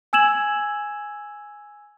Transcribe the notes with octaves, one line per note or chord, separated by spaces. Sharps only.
G#5 E6 G#6 E7 F#7